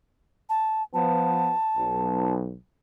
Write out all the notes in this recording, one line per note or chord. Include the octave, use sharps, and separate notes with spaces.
A5
F3 B3 A5
B1